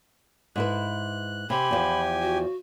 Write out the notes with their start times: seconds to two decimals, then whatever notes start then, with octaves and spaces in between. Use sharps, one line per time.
0.56 G#2 E4 B4 F#6
1.50 C3 G4 G#5 B5
1.71 E2 F3
2.22 F#4